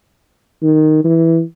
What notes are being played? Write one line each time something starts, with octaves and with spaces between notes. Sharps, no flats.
D#3
E3